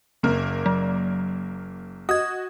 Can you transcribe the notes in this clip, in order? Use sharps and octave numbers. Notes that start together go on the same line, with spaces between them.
F#1 A#3 A#4
F#3
F#4 D#5 D#6 G#6